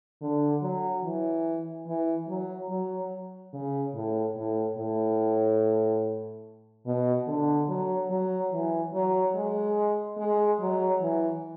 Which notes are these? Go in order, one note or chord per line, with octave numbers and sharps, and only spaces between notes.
D3
F#3
E3
E3
F#3
F#3
C#3
A2
A2
A2
B2
D3
F#3
F#3
E3
F#3
G#3
G#3
F#3
E3